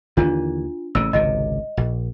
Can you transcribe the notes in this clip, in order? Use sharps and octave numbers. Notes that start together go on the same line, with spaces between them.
D#2 D3 E3 D4 F4
A1 C#3 E6
G#1 C#2 C3 D#5
A#1